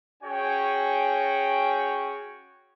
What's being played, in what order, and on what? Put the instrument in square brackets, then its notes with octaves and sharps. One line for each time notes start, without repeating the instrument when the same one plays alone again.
[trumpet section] C#4 F#4 G#4 C#5 G5